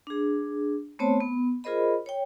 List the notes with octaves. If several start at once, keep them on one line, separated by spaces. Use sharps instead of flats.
D4 G#4
A3 B3 C4 C5 C#5 A5
B3
F4 G#4 A#4 C5 D#5 B5
C#5 G5